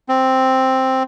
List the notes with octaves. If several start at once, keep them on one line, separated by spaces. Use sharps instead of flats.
C4